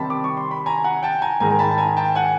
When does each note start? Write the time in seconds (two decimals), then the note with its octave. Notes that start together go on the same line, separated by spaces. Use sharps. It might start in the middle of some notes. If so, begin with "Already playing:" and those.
Already playing: C3 D#3 G3 C4 A5 B5
0.10 D6
0.24 C#6
0.37 C6
0.51 B5
0.66 G#5 A#5
0.84 F#5 G#5
1.03 G5 A5
1.22 G#5 A#5
1.40 G#2 D#3 G#3 G#5 A#5
1.51 A#5
1.59 A5 B5
1.71 A5
1.78 G#5 A#5
1.97 G5 A5
2.15 F#5 G#5